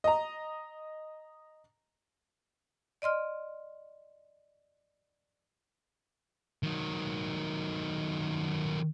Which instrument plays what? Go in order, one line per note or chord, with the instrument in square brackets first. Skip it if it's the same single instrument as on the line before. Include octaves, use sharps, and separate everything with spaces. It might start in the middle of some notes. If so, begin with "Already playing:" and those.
[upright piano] D#5 A#5
[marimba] D5 D#5 C6 F6
[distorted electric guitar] D#3 F#3